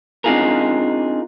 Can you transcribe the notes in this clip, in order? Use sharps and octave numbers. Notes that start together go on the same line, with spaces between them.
C4 D4 D#4 F4 G#4 A#4